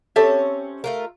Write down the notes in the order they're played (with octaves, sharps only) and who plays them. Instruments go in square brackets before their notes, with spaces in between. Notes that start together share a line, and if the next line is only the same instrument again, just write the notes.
[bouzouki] C4 C#4 C#5 [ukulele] G4 A4 E5
[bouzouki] A3 F4 A#4